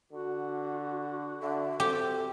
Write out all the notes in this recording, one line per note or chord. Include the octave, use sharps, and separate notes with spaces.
D3 F#4
D3 E5
C4 G4 A4